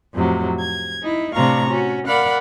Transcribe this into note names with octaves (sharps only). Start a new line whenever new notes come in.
F2 A2 C3 F#3
G#6
D#4 E4
A2 C3 D4 F5 A#5 C#6
C#4 F#4
A#4 D5 F5 F#5 B5 F#6